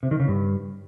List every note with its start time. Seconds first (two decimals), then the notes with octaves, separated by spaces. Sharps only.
0.03 C3
0.11 D#3
0.20 C#3
0.28 G2